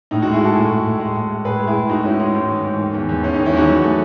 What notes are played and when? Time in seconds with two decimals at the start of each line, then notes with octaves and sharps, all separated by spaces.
0.11 A2 D#4
0.22 D#4 F#4
0.26 G#3
0.33 E4 G#4
0.40 G#3 F#4 A4
0.56 A2
0.71 A2
0.85 A2
1.00 G#3
1.15 A2
1.30 G#3
1.45 A2 G#4 B4
1.60 G#3
1.67 E4 G#4
1.74 A2
1.89 G#2 D#4 F#4
2.04 G#2 C#4 E4
2.19 G#3 D#4
2.34 G#2
2.49 E3
2.65 G#2
2.79 D#3
2.94 E2
3.09 E2
3.23 E2 C#4
3.34 D#4
3.39 D#3
3.46 C#4 E4
3.53 E2 D#4 F#4
3.68 F#3
3.83 A3